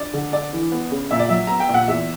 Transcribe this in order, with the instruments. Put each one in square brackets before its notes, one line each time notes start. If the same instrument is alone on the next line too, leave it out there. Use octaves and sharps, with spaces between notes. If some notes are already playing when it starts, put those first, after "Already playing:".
Already playing: [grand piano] D4 D5
D3
D4 D5
E3
B3
C#3
A#2 E5
D5
F#3 E5
B3 A#5
G5
A#2
F#5
E2 E5